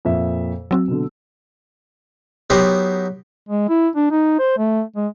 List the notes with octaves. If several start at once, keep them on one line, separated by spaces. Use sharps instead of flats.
F2 A#2 E5
F#3 C4 F#4 E6
B2 D3
F#3 B3 D#4 G4 A#4 C5
G#3
E4
D4
D#4
C5
A3
G#3